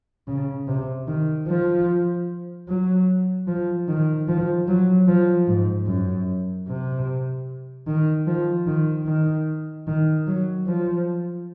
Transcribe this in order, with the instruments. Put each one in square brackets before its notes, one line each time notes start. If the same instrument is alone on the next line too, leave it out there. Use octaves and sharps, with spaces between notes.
[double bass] C#3
C3
D#3
F3
F#3
F3
D#3
F3
F#3
F3
G#2
F#2
C3
D#3
F3
D#3
D#3
D#3
F#3
F3